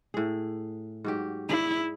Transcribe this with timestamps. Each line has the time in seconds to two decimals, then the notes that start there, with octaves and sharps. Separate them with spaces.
0.14 A2 G#4
1.04 G#2 F#3 G4
1.49 E4 G#4 D5